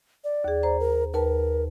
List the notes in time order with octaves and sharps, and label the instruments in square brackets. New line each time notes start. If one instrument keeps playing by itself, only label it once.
[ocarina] D5
[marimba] D#2 G#4
C5 A#5
[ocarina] A#4
[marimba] D#2 B4 A5 [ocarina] A#4